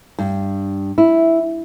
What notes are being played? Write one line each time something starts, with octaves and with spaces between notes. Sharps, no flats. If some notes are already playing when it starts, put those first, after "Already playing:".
G2
E4